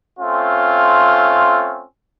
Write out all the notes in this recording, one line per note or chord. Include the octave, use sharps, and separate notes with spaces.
A3 C4 C#4 F4